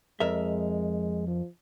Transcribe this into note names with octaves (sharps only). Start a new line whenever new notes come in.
F2 G#3 A#4 E5
F3